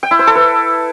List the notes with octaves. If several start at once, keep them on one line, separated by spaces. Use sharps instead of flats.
G5
E4
C5
A4
B4